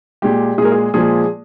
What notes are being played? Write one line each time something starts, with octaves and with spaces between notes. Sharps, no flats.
A#2 G#3 G4
A#2 G#3 G#4 A#4
G#4
A#2 F3 G#3 G#4